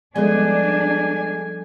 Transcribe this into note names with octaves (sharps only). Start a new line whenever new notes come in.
F3 G3 G#3 B3 D4 A4 G#5